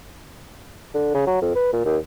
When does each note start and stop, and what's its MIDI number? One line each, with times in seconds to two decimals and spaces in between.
0.94 1.13 50
1.15 1.23 49
1.27 1.41 54
1.42 1.54 41
1.55 1.69 71
1.73 1.80 46
1.85 1.97 39